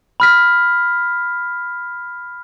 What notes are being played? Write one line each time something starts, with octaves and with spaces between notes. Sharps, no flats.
B5 F6 B6